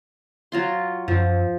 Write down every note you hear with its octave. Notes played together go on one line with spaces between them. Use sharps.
F#3 F4 C6
F#2 F3